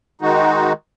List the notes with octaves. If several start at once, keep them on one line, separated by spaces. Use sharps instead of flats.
D#3 G#3 D#4 F#4